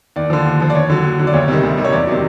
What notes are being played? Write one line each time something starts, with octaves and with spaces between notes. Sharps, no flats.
D#2 D5
D3 F3
D#2
D3 F3
D5
D#2 C#5
D3 F#3
D#2
D3 F#3
D5
D2 C#5
C3 D#3 G3
D2
C3 D#3 G3
C#5
E2 D5
C3 D#3 F#3